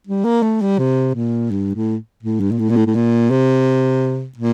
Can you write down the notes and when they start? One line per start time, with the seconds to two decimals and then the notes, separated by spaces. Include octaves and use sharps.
0.07 G3
0.24 A#3
0.42 A3
0.61 G3
0.78 C3
1.15 A#2
1.51 G2
1.74 A2
2.23 A2
2.40 G2
2.51 A#2
2.59 A2
2.69 A#2
2.76 A2
2.86 A2
2.95 A#2
3.30 C3
4.37 A#2